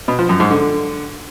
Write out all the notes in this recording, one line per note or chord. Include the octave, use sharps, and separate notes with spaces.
B2
F3
F#2
G#2
D3